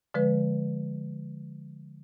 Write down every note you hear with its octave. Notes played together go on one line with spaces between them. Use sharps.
D3 F3 G#3 B4